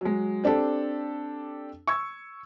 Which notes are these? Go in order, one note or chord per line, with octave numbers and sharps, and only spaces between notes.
F#3 G#3
C4 D4 G4 A4
C#6 E6 G#6